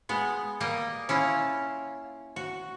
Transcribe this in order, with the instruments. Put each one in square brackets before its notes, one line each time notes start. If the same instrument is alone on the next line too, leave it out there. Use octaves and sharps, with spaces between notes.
[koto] G#3 B3
G3 A#3 D#5
C#4 E4 F4
F#4